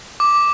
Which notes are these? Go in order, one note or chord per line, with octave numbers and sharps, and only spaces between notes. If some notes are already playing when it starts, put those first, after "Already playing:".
D6